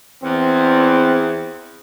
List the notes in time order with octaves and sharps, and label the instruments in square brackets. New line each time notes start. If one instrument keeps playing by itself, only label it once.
[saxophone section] E2 [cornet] C4